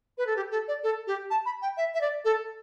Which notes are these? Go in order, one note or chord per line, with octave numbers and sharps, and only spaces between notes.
B4
A4
G4
A4
D5
A4
G4
A5
B5
G5
E5
E5
D5
A4